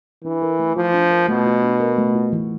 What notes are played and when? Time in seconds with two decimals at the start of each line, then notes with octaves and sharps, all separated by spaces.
0.24 E3 D4
0.42 A#4
0.59 A3
0.76 F3 F4
0.94 D4
1.11 A#4
1.28 B2 A3
1.46 F4
1.63 D4
1.80 A#4
1.98 A3
2.15 F4
2.33 E3